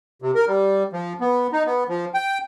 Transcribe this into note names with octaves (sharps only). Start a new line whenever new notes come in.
C3
A#4
G3
F3
B3
D#4
B3
F3
G5